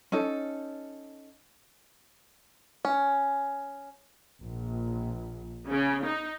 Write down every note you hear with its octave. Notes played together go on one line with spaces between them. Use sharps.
C#4 D#4 A4
C#4
A#1
C#3
D#4